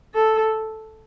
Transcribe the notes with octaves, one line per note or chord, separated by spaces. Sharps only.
A4